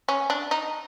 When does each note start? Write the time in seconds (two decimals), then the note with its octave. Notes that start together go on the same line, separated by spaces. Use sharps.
0.09 C#4
0.30 D4
0.51 D#4